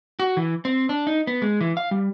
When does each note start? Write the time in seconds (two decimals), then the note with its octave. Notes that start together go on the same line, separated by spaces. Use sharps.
0.20 F#4
0.37 E3
0.65 C4
0.89 D4
1.07 D#4
1.27 B3
1.42 G#3
1.61 E3
1.77 F5
1.91 G3